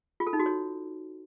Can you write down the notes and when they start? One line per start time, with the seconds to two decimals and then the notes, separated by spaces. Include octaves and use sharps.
0.20 F4
0.27 A4
0.33 D#4
0.39 F#4
0.46 C#5